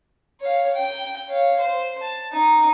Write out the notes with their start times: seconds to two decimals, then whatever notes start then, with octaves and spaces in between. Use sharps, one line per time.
0.40 C#5 F5
0.75 G5
1.29 C#5 F5
1.60 C5
2.01 A5
2.33 D#4